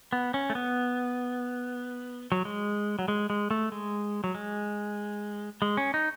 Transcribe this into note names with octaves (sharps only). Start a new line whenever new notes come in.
B3
C#4
A3
B3
F#3
G#3
F#3
G#3
G#3
A3
G#3
F#3
G#3
G#3
C#4
D#4